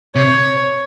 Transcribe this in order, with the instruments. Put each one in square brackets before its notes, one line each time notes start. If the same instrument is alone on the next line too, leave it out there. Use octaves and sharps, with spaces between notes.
[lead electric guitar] C3 [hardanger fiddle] C#5